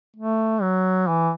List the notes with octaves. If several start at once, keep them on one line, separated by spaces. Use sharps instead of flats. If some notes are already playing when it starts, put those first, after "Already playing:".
A3
F#3
E3